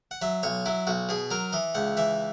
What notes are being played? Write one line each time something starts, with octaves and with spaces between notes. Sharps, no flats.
F#5
F#3 E5
B1 C#5
F#3 E4
B1 F#4
B2 G#4
F#3 A#4
E3 D#5
C#2 F#5
E3 E5